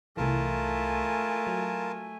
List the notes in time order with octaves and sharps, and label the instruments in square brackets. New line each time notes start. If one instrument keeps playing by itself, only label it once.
[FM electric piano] C2 E3 [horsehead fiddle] A3 G#5 [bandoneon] F4 A#4 A5
[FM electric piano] F#3